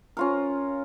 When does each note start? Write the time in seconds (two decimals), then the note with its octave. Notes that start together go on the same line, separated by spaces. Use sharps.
0.17 C#4 F4 A#4